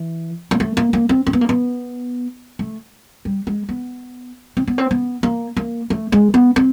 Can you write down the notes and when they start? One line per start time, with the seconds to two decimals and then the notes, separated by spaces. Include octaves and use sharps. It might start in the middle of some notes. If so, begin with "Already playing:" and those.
Already playing: E3
0.51 A#3
0.60 A3
0.77 A#3
0.93 A#3
1.09 C4
1.27 C4
1.33 B3
1.41 A#3
1.49 B3
2.59 A3
3.25 G3
3.47 G#3
3.69 B3
4.57 C4
4.68 B3
4.78 C4
4.91 B3
5.23 A#3
5.57 A#3
5.90 A3
6.12 G#3
6.34 B3
6.56 C4